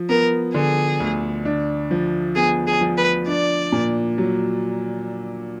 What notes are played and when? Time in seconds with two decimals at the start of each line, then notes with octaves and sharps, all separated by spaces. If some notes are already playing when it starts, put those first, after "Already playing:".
Already playing: F3
0.09 B3 A#4
0.54 D3 G#4
1.00 D2
1.45 D4
1.91 F3
2.36 B3 G#4
2.67 G#4
2.81 F3
2.97 B4
3.27 D4 D5
3.72 A#2
4.18 F#3